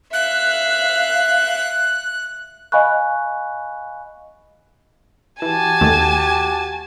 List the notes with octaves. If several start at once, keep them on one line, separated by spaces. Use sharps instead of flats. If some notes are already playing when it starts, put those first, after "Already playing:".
E5 F5 F#6
D#5 F5 G#5 B5 C#6 F#6
E3 F#4 G4 G#5 A5
D#2 D#3 A3